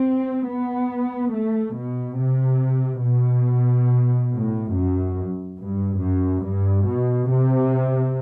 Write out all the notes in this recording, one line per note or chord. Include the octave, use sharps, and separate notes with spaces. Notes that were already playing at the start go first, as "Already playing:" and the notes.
Already playing: C4
B3
A3
B2
C3
B2
A2
F#2
G2
F#2
G2
B2
C3